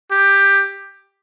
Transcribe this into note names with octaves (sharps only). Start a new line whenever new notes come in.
G4